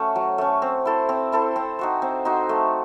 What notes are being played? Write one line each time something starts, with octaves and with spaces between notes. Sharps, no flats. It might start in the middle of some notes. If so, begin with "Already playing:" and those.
Already playing: A3 C#4 F#4
F#3
A3 C#4
C4
E4 A4 C5
C4
E4 A4 C5
C4
D#4 F#4 C5
C4
D#4 F#4 C5
A3